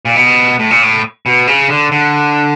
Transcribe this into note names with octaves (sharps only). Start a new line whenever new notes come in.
A#2
B2
A2
A#2
A2
B2
C#3
D3
D3